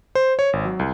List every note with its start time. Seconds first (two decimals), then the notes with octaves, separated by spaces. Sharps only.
0.15 C5
0.39 C#5
0.53 G#1
0.65 F#3
0.79 C2